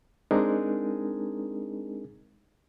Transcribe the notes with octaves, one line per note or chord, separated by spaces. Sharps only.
G#3 C4 D4 D#4 G#4 A#4